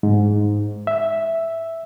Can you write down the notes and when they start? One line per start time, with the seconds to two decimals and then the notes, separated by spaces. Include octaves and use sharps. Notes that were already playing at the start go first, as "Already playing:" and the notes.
0.03 G#2
0.87 E5